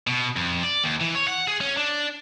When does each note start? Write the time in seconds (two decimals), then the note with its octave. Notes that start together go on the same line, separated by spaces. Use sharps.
0.07 B2
0.36 F2
0.63 D5
0.84 D#2
1.00 E3
1.15 C#5
1.28 F#5
1.48 G#4
1.61 C#4
1.77 D4